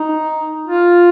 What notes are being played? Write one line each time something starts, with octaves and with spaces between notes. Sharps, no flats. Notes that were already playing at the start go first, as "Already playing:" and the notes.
Already playing: D#4
F4